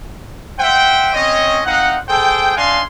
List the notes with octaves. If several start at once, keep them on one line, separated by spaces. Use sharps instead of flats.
C5 E5 F#5 G5
C4 C#4 C#5 D#5
C4 D#4 F5 F#5
G#4 A4 C5 G5
D4 D#5 F5 F#5 G#5 C6